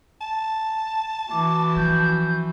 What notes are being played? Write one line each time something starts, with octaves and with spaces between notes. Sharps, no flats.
A5
E3 E4 F#4 D6
F3 C#4 G6